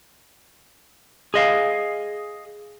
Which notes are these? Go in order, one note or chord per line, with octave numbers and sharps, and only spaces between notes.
G#4 D#5 F5